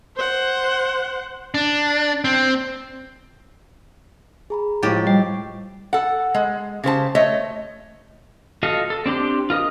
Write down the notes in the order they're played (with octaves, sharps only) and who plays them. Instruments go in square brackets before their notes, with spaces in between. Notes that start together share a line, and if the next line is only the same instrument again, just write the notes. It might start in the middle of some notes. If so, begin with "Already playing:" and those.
[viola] C5 F#5
[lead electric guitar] D4
C4
[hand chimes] G#4 A#5 B5
[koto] A2 G4 [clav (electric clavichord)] F3 G#3 [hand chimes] C#6 A6
[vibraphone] G3 [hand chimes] D#5 G5
[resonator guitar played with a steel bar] A4 F#5
G#3
C#3 G4 C5 A5
A3 C#5 D#5
[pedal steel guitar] F4 F#4 A4 D#5 F5
A4
C4 D4 G4 C6
F4 A#4 D#5 D#6